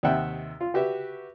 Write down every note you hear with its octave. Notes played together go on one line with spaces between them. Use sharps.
D#2 C3 D#3 E5 F#5 G5
F4
F#4 G4 B4 E5